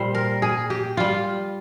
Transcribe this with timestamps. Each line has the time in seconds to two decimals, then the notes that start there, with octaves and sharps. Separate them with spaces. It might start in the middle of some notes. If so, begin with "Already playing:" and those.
Already playing: A#2 G3 C5
0.15 A#4
0.42 G#4
0.70 G4
0.97 G3 F4